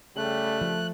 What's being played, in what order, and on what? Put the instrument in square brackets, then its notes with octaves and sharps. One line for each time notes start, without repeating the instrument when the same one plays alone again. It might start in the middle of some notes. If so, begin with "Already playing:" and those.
[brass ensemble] C#3 G3 [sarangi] A3 [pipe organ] F#6
[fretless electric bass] F3